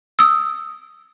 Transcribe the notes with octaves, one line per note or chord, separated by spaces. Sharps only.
D#6 E6